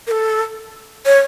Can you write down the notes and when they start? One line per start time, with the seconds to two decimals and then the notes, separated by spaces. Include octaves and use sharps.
0.07 A#4
0.11 A4
1.06 C#5